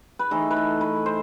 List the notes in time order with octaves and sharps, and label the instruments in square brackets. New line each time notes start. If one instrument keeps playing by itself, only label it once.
[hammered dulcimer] B4
E3 A3 D#4 A4
B4
A4
B4
C5